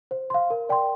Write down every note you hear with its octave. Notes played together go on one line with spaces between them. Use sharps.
C5
F5 C6
A#4
D5 G5 C6